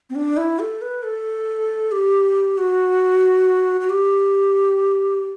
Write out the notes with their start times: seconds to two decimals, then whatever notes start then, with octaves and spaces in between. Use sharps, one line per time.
0.10 C4
0.15 D4
0.37 E4
0.59 A4
0.82 B4
1.03 A4
1.92 G4
2.58 F#4
3.81 F#4
3.90 G4